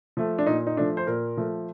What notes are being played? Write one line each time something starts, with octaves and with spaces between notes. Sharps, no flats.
F3 A3
D4
A#2 D#4
D#4
F3 A3 D4
C5
A#2 A#4
F3 A3